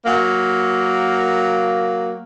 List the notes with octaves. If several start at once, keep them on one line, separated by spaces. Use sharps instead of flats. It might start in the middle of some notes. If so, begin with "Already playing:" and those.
F#3 A#3